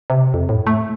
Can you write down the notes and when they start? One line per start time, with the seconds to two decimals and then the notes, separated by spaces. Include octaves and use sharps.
0.10 C3
0.34 F2
0.49 A2
0.67 A3